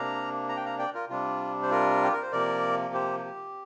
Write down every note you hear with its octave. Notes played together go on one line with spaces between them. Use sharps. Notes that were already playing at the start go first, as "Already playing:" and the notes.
Already playing: C3 A#3 D4 F5 A#5
A#5
G5
F5 A#5
D5 G5
F4 A#4
C3 G3 D4 F4
C5
F4 A#4
G4
A#4
C5
C3 F3 A#3 A#4 D5
G4 C5
G4